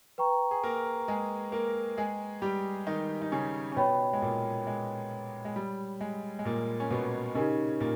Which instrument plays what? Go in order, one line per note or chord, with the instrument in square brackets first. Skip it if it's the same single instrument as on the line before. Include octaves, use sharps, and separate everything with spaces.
[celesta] B4 G5 A#5 C#6
[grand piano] G#4
A#3 A#4
G#3 G#4
A#3 A#4
G#3 G#4
G3 G4
D#3 D#4
D#4
C#3 C#4
C#4
[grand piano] B2 B3 [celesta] C#5 G5 B5
[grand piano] G#3
A#2 A#3
G#3
G#3
G3
G#3
G#3
A#2 A#3
C#4
B2 B3
[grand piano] C#3 C#4 [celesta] D#4 G4 A#4 D#5
[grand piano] A#2 A#3